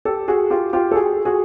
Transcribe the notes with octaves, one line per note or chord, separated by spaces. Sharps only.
G4 A4
F#4 G#4
F4 G4
F4 G4
A4
F#4 G#4
F#4 G#4